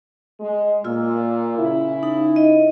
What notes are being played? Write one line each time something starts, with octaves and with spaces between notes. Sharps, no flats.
G#3
A#2 F4 E6
C#3 E4
D#4
D#5